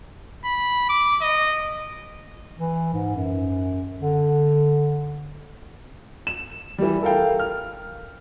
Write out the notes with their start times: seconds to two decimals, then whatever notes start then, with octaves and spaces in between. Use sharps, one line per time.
0.45 B5
0.89 D6
1.22 D#5
2.59 E3
2.93 G#2
3.16 F#2
4.00 D3
6.27 E7
6.78 E3 G3
7.03 A4 A#4 F5 G5
7.39 F6